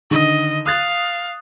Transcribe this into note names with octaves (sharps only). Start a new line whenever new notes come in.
D3 D#3 D#5
F5 D#6 F#6 A6